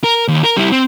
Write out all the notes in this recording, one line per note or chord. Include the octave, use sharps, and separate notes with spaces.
A#4
D#2
A#4
G3 E4
C4